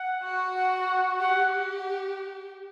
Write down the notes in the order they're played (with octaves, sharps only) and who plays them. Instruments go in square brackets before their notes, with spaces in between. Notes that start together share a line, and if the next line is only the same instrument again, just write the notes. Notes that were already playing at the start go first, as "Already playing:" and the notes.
Already playing: [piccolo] F#5
[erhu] F#4
[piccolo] F#5
[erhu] G4 [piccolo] F#5